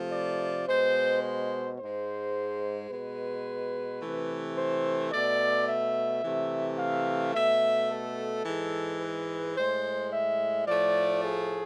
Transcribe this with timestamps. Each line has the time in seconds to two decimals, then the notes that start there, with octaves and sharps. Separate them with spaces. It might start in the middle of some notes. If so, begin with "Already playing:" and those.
Already playing: C3 F3 A3
0.12 D5
0.68 B2 G#3 C5
1.23 C5
1.79 G#2 G#3 C5
2.90 B2 G#3 B4
4.01 C3 E3 A3
4.56 C5
5.12 B2 A3 D5
5.67 E5
6.23 C3 E3 A3
6.79 F5
7.34 B2 A3 E5
7.90 A4
8.45 G#2 E3 G#3
9.01 B4
9.56 A2 G#3 C5
10.12 E5
10.67 A2 F3 A3 D5
11.23 G#4